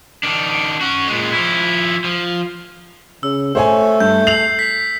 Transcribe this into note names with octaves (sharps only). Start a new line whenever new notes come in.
D#3 D4
C#4 F#4
A#2 G#3
F3 E4
F3
C#3 E6
A3 C5 C#5 G#5
G2 G6
C7 F7 F#7
B6